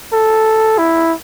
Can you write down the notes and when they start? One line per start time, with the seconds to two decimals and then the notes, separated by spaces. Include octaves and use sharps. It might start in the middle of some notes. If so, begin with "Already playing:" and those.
0.12 A4
0.78 E4